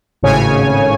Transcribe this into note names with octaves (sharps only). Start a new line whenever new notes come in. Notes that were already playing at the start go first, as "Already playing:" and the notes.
G#1 A2 C#3 C#5 G#5